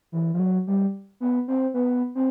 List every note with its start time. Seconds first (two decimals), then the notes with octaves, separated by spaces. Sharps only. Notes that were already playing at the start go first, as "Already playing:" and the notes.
0.12 E3
0.34 F3
0.39 F#3
0.67 G3
1.20 B3
1.48 C4
1.74 B3
2.15 C4